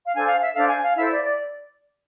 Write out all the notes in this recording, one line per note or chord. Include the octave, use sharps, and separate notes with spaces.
F5
D4 A4 C5 G#5
F5
E5
D4 A4 C5 F5
G#5
F5
E4 A4 C5 E5
D5
D5